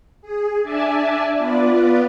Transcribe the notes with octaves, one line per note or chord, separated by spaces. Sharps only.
G#4
D4 D5 E5 G#5 A5
B3 F4 B4 D5